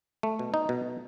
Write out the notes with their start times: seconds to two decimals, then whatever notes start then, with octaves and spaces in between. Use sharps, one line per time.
0.23 A3
0.39 B2
0.54 D#4
0.69 B2